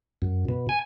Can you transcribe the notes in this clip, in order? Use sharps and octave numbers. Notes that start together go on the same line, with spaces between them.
F#2
B2
G#5